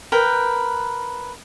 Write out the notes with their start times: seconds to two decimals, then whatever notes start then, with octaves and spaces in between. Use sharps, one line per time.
0.12 A#4 B4 G5